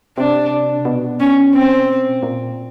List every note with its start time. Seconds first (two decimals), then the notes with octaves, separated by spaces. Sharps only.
0.18 C3 D4
0.85 B2
1.20 C#4
1.54 C4
2.23 A#2